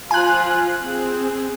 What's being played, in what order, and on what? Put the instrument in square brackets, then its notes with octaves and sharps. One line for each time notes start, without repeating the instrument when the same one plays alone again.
[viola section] F3 F4 [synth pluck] G#5 F#6
[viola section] C4 G#4